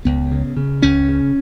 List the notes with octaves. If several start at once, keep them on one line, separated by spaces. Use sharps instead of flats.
C#2 B3
C#3
C#3
C#2 C#4
C#3